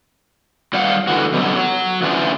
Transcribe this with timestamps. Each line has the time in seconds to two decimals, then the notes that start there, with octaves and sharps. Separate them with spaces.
0.73 F#3 G3 F5 F#5
1.07 D3 E3 F#4
1.33 F#2 B2 D3 F#3 G3
1.56 F#3
2.02 E3 F#3 C#4 D4 F4